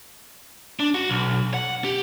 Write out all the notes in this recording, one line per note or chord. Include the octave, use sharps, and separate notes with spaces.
D4
F#4
B1
F#5
G4